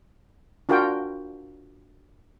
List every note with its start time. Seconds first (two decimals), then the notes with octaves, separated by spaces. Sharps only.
0.69 D4 F4 F#4 A#4 G5